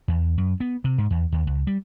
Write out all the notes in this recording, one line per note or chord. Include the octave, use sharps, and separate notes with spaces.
E2
F#2
B3
C3
G#2
E2
D#2
C#2
G3